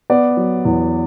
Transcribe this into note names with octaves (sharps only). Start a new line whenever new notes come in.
B3 D5
F#3
E2